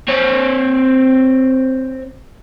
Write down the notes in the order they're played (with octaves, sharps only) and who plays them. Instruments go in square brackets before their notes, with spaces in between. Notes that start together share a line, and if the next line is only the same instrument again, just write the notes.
[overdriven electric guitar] C4 C#5